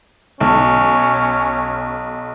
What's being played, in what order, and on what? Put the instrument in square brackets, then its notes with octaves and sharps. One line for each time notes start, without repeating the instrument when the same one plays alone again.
[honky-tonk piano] B1 [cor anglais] C#4